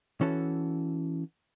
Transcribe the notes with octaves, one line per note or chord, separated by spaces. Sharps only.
E3 C#4 F#4 A4